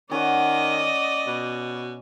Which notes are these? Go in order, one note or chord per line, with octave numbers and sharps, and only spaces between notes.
D#3 C#4 D5 D#5 F#5
B2